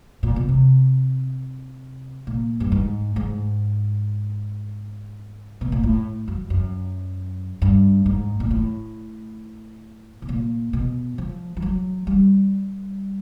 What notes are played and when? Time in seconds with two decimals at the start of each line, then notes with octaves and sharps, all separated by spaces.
0.23 A#2
0.36 B2
0.49 C3
2.27 A#2
2.60 G2
2.72 G#2
3.16 G#2
5.61 B2
5.72 A#2
5.83 A2
6.28 F#2
6.50 F#2
7.62 G2
8.06 G#2
8.40 A#2
8.51 A2
10.22 B2
10.29 A#2
10.73 B2
11.18 F3
11.57 F3
11.62 F#3
12.07 G3